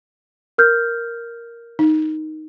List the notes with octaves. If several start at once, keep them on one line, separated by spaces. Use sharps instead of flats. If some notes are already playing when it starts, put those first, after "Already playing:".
A#4 F6 G6
D#4